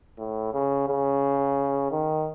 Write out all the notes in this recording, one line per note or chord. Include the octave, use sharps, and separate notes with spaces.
A2
C#3
C#3
D#3